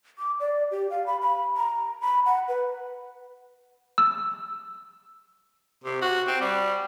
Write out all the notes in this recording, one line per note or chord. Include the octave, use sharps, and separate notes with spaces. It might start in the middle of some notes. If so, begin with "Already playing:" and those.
D6
D5
G4
F5
B5
B5
A#5
B5
F#5
B4
E6
C3
F#4
C4
G3